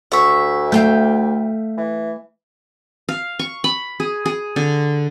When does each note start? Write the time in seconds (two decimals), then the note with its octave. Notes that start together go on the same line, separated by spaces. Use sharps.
0.12 D2 E5 C#6
0.72 A3 E5 F5 G5 G6
1.78 E3
3.09 F5
3.39 C#6
3.64 B5
4.00 G#4
4.26 G#4
4.56 D3